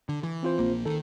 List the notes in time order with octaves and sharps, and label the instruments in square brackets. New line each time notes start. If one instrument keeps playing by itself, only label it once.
[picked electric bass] D3
E3
[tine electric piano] C4 F4 C5
[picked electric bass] A#1 A#3
[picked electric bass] D#3 [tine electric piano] A4